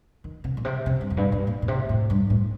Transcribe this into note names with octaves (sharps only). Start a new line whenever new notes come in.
D#3
C3
A#2
C3
C3
G2
F2
G2
A2
A#2
A#2
C3
A2
G2
A2